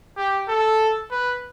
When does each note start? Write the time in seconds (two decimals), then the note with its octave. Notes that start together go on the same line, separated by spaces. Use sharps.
0.17 G4
0.48 A4
1.11 B4